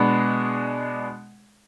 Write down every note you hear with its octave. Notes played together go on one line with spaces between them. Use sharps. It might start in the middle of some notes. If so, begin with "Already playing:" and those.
Already playing: B2 G#3 B3 D4